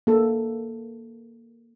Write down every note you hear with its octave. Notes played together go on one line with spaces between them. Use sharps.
A#3 A4